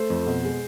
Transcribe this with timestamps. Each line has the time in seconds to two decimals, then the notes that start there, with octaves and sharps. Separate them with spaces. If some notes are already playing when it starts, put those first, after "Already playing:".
Already playing: A3 C5
0.10 F2
0.26 B2
0.44 G#3